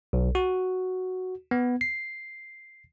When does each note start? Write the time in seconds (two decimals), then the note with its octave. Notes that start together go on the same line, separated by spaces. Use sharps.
0.13 B1
0.35 F#4
1.51 B3
1.81 C7